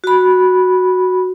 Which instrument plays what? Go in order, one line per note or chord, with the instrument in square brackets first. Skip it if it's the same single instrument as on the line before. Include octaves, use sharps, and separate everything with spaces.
[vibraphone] F#4 B5